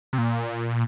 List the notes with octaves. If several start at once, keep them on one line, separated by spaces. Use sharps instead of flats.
C3
A#2